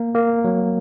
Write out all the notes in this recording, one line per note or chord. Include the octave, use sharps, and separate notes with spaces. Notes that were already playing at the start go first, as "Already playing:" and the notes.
Already playing: A#3
A#3
F#3